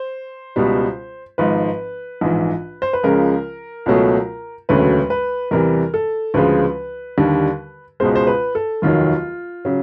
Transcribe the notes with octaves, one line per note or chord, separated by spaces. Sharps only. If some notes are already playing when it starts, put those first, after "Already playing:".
Already playing: C5
C#2 B2 G3
G#1 G#2 F3 B4
A#1 G#2 E3
C5
B4
C#2 C#3 F3 G#3 A#4
C#2 B2 F#3 A3
E1 D2 C#3 F#3 A3 B4
B4
E2 C3 E3 G3 A#4
A4
D2 C#3 F3 G#3 B4
D#2 D3 G3
C#2 B2 G#3 C5
C5
B4
A4
F1 D#2 D#3 F#3 F4
C#3 F#3